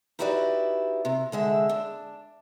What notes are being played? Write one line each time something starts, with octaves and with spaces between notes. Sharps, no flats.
D#4 E4 F#4 G4 B4 D5
C3
D3 G#3 E5
D4